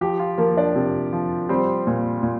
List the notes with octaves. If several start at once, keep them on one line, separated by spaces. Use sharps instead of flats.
F3 G4
F4
F3 A#3 A#4
D4 D5
C3
F3
G3 C4 C5
A#2
A#2